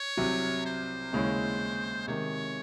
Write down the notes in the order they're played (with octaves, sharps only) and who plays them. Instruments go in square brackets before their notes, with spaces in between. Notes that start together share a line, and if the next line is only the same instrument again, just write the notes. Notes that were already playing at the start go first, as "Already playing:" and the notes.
Already playing: [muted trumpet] C#5
[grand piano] C2 C3 F#3
[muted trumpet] C5
[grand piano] D#2 C#3 G#3 C#4 E4
[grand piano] C3 D#3 G#3 [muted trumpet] C#5